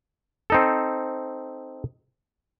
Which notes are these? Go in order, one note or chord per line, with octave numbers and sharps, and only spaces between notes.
C4 D#4 A4